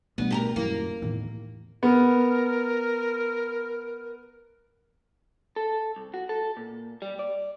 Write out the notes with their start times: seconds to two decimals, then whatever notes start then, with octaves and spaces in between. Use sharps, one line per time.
0.18 B2 G3 A3 B3 D4
0.31 G4 A4 A#4
0.56 D#1 F#2 A#3 E4
1.02 E2 A2 D#3
1.83 B3 A#4
5.56 A4
5.96 C2
6.14 F#4
6.29 A4
6.57 A#2
7.02 G3
7.19 D5